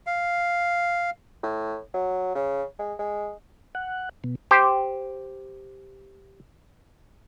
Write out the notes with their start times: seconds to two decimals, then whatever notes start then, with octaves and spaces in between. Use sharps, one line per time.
0.07 F5
1.43 A2
1.94 F#3
2.35 C#3
2.79 G#3
2.99 G#3
3.75 F#5
4.24 B2
4.51 G4 C5